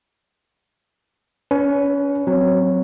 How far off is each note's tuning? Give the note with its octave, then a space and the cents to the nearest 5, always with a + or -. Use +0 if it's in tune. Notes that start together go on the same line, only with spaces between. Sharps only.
C#4 +30 B4 +0
F#3 +0 C4 +0